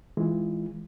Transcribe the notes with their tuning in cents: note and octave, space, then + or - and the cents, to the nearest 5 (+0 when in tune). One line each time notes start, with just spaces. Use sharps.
E3 -20 G#3 +0 F4 -25